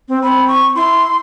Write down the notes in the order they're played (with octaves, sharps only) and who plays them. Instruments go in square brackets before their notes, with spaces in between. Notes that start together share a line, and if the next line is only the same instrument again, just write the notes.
[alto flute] C4
[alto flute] C4 [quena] B5
[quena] C#6
[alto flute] E4 [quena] C6